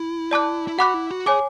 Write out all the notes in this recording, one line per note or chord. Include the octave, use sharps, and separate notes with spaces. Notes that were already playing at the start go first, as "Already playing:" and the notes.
Already playing: E4
D5 A5 D6 F#6
E4
F#4 F#5 B5 D6 F#6
E4
F#4
G#4 C#5 G#5 D6